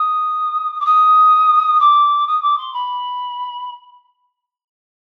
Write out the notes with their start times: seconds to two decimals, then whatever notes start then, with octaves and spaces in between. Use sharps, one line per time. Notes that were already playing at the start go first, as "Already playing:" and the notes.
Already playing: D#6
0.79 D6
0.85 D#6
1.79 D6
2.26 D#6
2.42 D6
2.57 C6
2.73 B5